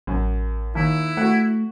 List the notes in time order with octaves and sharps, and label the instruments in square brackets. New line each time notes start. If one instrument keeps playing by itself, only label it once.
[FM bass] A1 [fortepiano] F#2
[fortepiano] D#2 [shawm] E4
[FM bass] A3 [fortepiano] F#4 F#5